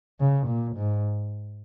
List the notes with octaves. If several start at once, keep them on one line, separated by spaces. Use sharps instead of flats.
C#3
A#2
G#2